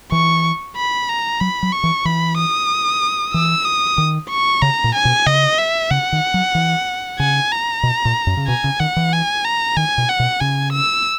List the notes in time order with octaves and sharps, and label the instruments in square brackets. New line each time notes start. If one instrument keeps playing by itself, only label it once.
[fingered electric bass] E3 [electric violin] C#6
[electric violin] B5
A#5
[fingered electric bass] F#3 [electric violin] B5
[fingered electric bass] F#3
[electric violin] C#6
[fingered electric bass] E3
[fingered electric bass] E3 [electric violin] B5
[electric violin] D#6
[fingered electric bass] E3 [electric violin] E6
[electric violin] D#6
[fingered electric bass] D#3
[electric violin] C#6
[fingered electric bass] C#3 [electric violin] A#5
[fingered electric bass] A#2
[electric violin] G#5
[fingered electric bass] B2
[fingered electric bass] C#3 [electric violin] D#5
[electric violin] E5
[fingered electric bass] C#3 [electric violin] F#5
[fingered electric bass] D#3
F#3
E3
[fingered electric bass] C#3 [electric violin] G#5
[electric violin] A#5
[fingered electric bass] B2
A#2
F#2
C#3
[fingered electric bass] B2 [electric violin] G#5
[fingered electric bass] C#3
[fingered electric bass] D#3 [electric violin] F#5
[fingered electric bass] E3
[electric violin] G#5
A#5
[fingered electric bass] D#3 [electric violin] G#5
[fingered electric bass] B2
[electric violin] F#5
[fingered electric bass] B2
[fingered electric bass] C#3 [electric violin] G#5
[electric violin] E6